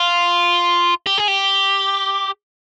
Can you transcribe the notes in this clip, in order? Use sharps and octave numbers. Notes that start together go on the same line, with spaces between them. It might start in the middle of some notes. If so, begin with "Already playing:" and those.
Already playing: F4
G4
G#4
G4